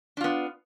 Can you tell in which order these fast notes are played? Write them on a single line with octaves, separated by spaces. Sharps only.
D4 F4 B3